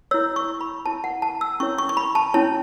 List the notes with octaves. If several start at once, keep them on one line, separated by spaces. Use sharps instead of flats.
E4 C#5 E6
C#6
B5
E4 C#5 A5
F#5
A5
E6
C#4 E4 C#5 C#6
C#6
C#6
B5
A5
C#4 E4 C#5 A5